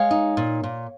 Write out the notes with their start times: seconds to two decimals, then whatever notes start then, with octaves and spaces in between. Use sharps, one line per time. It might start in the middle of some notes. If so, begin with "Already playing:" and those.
Already playing: G#3 C#5 F5
0.11 D#4
0.37 A#2
0.63 A#2